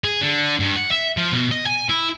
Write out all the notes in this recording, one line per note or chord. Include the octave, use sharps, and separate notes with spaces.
G#4
D3
G2
F#5
E5
F3
B2
D#5
G#5
E4